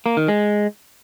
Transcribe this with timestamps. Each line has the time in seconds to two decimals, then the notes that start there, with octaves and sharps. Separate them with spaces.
0.06 A#3
0.17 D#3
0.28 G#3